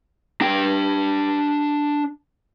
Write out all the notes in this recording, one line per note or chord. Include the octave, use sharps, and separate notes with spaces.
D4 G5